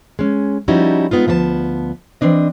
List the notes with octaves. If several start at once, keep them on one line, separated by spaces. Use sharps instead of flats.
G#3 C#4
F3 G3 C#4 D#4 E4 F#4
G#3 B3 D#4 F4
D2 F3 B3 C#5 A5
E3 C4 D4 D#5